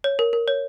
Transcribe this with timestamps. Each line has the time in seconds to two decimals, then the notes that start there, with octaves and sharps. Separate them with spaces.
0.04 C#5
0.19 A#4
0.33 A#4
0.48 C#5